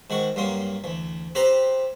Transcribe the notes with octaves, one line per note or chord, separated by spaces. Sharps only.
G#2 D#3 F#4 C#6
G2 F#3 G3 A#3 C6
D2 E3
C4 G4 B4 C5 A#5 C6